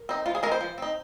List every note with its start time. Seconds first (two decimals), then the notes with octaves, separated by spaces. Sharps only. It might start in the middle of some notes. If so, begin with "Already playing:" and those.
Already playing: A#4
0.09 C4 D#4
0.26 F3 F4
0.35 G#4
0.43 G#3 C4 A#4
0.52 C5
0.61 F3
0.78 C4 D#4